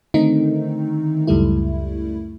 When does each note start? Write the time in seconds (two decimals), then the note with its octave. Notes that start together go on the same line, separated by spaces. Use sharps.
0.14 D3 D#3 A3 C4 D#4
1.27 C#2 F#2 G3 A3 E4